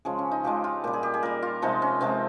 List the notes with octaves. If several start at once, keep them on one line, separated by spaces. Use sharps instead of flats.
C#3 F3 G#3 G#4
C#4
D#4
C#3 F3 G#3 G4
F4
A#2 G3 G4
G#4
G4
G#4
A#2 G3 A#4
F4
C3 F3 G#3 D#4
C#4
C3 F3 G#3 C4